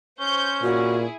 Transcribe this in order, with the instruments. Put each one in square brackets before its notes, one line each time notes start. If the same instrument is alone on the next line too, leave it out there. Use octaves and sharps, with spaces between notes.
[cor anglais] C#4 [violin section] C5 C#6 G6
[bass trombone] A#2 [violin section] E4 G#4 [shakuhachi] F#4